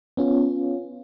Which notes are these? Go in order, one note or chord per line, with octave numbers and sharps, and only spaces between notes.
B3 C#4 F4